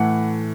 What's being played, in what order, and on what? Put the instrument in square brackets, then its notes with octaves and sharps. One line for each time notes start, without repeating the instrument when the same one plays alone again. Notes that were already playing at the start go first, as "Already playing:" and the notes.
Already playing: [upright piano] A2 E3 A3 F#5